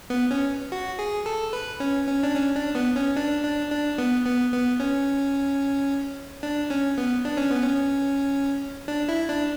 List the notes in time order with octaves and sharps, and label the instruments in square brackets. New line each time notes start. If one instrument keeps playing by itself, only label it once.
[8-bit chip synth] B3
C#4
F#4
G#4
A4
B4
C#4
C#4
D4
C#4
D4
B3
C#4
D4
D4
D4
B3
B3
B3
C#4
D4
C#4
B3
D4
C#4
B3
C#4
D4
E4
D4